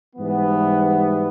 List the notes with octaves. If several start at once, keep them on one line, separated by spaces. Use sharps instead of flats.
G#2 E3 G3 B3